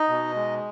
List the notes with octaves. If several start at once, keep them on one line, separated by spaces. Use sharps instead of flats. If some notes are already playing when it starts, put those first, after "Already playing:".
Already playing: D#4 D#5
B2
G#3